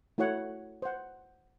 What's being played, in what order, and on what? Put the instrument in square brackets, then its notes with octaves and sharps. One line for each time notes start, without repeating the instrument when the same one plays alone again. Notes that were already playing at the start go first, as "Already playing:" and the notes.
[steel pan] A3 E4 F#4 C#5 F#5
C5 F#5